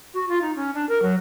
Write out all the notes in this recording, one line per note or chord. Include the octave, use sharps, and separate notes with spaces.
F#4
F4
D#4
C#4
D4
A#4
F#3